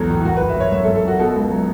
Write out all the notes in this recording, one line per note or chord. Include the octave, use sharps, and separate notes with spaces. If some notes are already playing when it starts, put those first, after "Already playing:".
Already playing: B1 E2 F#3 A4
A2
F#1 F#4
B4
F#1
E5
F#1 C#5
F#2 E5
A4
F#2
A4
F#1 F#4
B2 A4
C#2
F#3